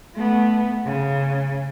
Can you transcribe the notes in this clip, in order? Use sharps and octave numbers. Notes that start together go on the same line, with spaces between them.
A3 B3
C#3